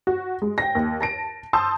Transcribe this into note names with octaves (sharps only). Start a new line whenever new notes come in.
F#4
G#3
G5 A#6
D#2
A5 A#6 D7
A5 C6 D#6 E6 G6